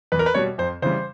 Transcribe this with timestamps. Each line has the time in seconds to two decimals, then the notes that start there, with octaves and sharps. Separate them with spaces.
0.12 E2 B4
0.19 A#4
0.26 B4
0.34 B2 G3 C#5
0.58 F2 C5
0.82 C#3 E3 G3 C5